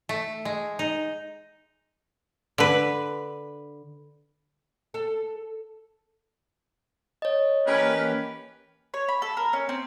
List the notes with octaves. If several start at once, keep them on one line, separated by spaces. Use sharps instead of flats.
A3
G#3
D#4
D3 B4
A4
C#5 D#5
E3 A#3 C#4 G4 A#4 B4
C#5
B5
A4
A#4
C#4
C4